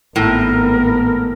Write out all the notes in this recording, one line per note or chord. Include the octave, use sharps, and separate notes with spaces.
G#1 A2 B3 A#4